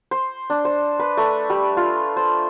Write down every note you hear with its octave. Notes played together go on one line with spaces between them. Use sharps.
C5
D4
C5
B4
A3
G3
F4
C5